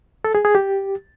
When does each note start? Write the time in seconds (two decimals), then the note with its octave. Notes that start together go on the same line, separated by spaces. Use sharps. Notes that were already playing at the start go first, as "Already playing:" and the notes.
0.24 A4
0.35 G#4
0.45 G#4
0.55 G4